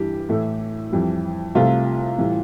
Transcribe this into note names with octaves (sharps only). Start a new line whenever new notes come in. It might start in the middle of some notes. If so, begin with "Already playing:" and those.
Already playing: G2 E3 G3 G4
A2 E3 A3
F2 E3 G3
C2 C3 F3 A3 F4
A2 E3 G3